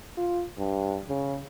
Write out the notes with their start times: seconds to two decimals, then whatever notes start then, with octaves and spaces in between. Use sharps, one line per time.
0.17 F4
0.58 G2
1.09 C#3